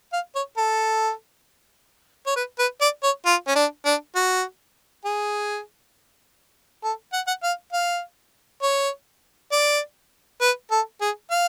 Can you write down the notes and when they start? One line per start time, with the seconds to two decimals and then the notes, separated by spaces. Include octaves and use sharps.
0.13 F5
0.35 C#5
0.57 A4
2.26 C#5
2.36 B4
2.59 B4
2.81 D5
3.03 C#5
3.26 F4
3.47 C#4
3.56 D4
3.85 D4
4.15 F#4
5.05 G#4
6.83 A4
7.13 F#5
7.27 F#5
7.43 F5
7.73 F5
8.62 C#5
9.52 D5
10.41 B4
10.71 A4
11.01 G#4
11.30 F5